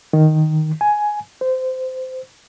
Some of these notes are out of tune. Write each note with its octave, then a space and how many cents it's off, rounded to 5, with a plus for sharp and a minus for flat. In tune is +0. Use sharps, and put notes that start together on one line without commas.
D#3 +0
G#5 +10
C5 -20